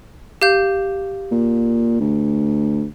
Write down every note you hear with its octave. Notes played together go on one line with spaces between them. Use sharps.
G4 F5 G6
A#2
D2